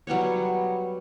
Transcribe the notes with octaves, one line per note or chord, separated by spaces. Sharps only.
F#3 G3 B3 C#5